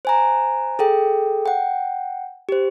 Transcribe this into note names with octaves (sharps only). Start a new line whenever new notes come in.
C5 G#5 A#5
G#4 A4 G5
F#5 G5
G4 C5